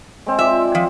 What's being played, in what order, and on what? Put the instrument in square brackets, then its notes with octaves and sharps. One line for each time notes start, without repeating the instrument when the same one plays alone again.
[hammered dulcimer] G#3 C4
[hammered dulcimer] F4 D5 [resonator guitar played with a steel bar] E5
[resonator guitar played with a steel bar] F3